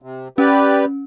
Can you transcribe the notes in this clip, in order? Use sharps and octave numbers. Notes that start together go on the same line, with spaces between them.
C3
C#4 G4 B4 D5